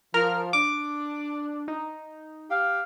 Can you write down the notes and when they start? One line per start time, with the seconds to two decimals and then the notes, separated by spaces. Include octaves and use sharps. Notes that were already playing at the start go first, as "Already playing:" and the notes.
0.14 F3 A#4 F6
0.53 D4 D6
1.68 D#4
2.50 G4 F5